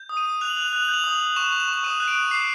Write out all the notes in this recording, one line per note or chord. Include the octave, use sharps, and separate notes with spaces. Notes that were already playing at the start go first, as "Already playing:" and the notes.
Already playing: G6
D#6
D#7
D#6
F#6 F7
F#7
F#6 F7
F#7
F#6 F7
F#7
G6
F7
D#6
D#6
C#6 E7
C#6
E7
C#6
E7
D#6 D#7
F#6
D7
D#6
D6 C7